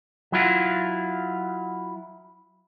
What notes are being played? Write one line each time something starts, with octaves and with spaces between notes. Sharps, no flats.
F#3 E4 F4